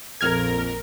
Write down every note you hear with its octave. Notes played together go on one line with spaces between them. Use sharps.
A#1 F2 A#4 F6 G#6